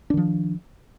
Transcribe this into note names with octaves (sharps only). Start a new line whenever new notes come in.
D#3 F3 D4